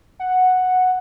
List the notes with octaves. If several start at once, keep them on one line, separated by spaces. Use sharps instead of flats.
F#5